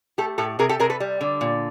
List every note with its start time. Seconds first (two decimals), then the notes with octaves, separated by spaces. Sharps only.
0.18 A3 G4 A4
0.38 A2 G4 A4
0.59 C3 G#4 A#4
0.69 G4 A4
0.80 C3 G#4 A#4
0.90 A4 B4
1.00 G3
1.21 D3
1.41 A#2